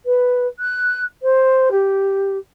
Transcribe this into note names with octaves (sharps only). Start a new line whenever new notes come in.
B4
F#6
C5
G4